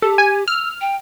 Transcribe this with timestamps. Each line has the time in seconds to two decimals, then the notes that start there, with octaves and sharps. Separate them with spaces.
0.02 G4 A4
0.18 G#5
0.48 E6 F6
0.81 G5